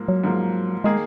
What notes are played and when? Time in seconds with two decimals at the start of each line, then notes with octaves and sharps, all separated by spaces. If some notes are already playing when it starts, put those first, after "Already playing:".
Already playing: G#2 F3 A#3
0.08 F#3
0.24 G#2 F3 A#3
0.84 D#3 G#3 A#3 D#4 G#4